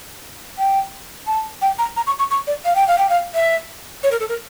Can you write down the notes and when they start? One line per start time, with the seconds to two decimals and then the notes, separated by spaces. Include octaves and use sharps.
0.58 G5
1.27 A5
1.62 G5
1.79 A#5
1.97 A#5
2.07 C#6
2.19 C#6
2.31 C#6
2.47 D5
2.65 F5
2.75 G5
2.88 F5
2.98 G5
3.09 F5
3.34 E5
4.03 C#5
4.11 A#4
4.20 A4
4.29 A#4